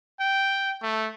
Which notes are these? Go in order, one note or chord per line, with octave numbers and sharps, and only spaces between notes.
G5
A3